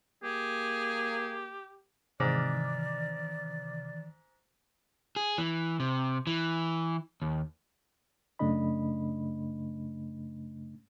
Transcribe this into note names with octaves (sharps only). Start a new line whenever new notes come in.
A#3 G4 G#4
G#2 C3 D#3 E3 D5 D6 F6
G#4
E3
C3
E3
D#2
F#2 C#3 A3 D4 D#5 B5